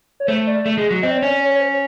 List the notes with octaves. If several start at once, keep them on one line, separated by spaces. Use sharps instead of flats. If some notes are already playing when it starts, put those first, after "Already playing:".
C#5
A3 C5
D5
A3
G#3
F#3
C4 D#5
D5
C#5
C#4 D5
C#5
C#5
C5
C#5